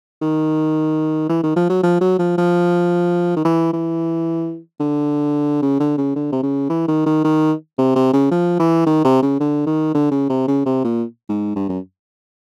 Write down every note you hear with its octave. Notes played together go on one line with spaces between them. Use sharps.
D#3
E3
D#3
F3
F#3
F3
F#3
F3
F3
D#3
E3
E3
D3
C#3
D3
C#3
D3
C3
C#3
E3
D#3
D#3
D#3
C3
C3
C#3
F3
E3
D#3
C3
C#3
D3
D#3
D3
C#3
C3
C#3
C3
A#2
G#2
G2
F#2